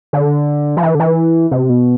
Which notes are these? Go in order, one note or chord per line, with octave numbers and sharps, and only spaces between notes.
D3
F3
E3
D3
E3
C3
B2